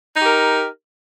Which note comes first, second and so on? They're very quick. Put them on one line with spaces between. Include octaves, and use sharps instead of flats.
D#4 G4 A#4